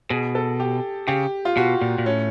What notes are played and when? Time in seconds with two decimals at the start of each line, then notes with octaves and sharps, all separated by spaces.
0.10 B2 G#4
0.35 A4
0.60 G4
1.07 C#3 G4
1.45 F4
1.57 B2 F#4
1.81 A#2
1.98 A#2
2.05 A2 C#4